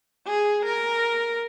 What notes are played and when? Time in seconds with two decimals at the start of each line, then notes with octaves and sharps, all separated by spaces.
0.27 G#4
0.65 A#4